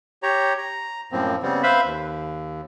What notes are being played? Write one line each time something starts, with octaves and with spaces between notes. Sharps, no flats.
G4 C#5 A#5
A#5
F#2 A2 F3 A#3 C4
C#3 G3 B3 C4
B4 C5 E5 F5 B5
D#2